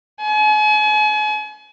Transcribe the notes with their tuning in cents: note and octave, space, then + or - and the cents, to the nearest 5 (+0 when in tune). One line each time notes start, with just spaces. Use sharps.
G#5 +40